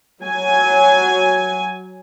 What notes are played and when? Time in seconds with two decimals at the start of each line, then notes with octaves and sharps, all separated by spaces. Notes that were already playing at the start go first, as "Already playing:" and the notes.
0.22 F#3 G#5